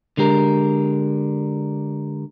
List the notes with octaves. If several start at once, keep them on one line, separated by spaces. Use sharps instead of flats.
D3 G#3 G4 A#4